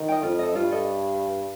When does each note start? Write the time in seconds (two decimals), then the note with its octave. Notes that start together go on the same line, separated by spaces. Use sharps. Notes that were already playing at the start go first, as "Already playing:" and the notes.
Already playing: D#3
0.08 D#5 G5
0.23 F2 F4
0.39 A4 D#5
0.55 G2 F4
0.71 A4 D#5